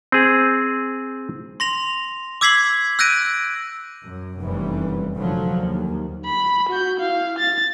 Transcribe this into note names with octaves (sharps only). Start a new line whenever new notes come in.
C4 G#4
C6 A#6 F7
D6 E6 G#6 B6 C7 F#7
E6 F#6 G6 A#6 D7 D#7
F#2
F1 F#2 E3 G3
F1 D3 F3 F#3
D#2
B5
F#4 G6
E4 F5
A6